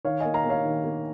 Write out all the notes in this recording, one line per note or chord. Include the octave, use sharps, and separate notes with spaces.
D#3 C#5 F5
A#3 D#5 G#5
F5 A#5
A#3
C#5 F5
D#3
A#3